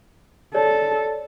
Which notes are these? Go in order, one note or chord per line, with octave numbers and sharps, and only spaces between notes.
A4 C#5 D5